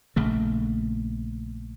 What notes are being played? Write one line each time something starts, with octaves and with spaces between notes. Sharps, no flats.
A#1 C#3 A3